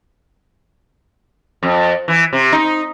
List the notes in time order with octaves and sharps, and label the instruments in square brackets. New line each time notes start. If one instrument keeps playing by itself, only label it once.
[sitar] F2
E3
C3
D#4